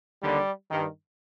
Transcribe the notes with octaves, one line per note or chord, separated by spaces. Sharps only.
D#2 D3 G3
G2 D#3